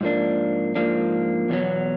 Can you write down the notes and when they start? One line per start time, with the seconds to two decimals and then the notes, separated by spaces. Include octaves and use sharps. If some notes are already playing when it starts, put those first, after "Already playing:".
0.01 G#2 F3 A#3 D4
0.75 G#2 F3 A#3 D4
1.49 E2 B2 F#3